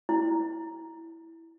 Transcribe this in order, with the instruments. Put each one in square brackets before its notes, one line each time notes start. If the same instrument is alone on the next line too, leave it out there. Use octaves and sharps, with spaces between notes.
[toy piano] E4